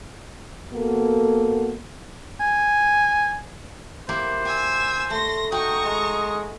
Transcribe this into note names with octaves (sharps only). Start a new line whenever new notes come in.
A#3 B3 F#4 A4
G#5
A#3 E4 G4 C5
G4 G#5 E6
A3 C6 A#6
D#4 F#4 G5 A#5 C#6 D#6
G#3